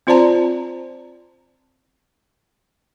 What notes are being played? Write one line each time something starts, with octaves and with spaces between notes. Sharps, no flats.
C4 F4 C5 D5 A5 A#5